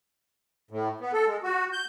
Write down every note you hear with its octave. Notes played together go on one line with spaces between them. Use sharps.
A2
B3
A4
G#3
F#4
G6